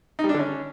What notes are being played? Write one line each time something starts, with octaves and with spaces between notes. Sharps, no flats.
D#4
G3
D4
D3
C#4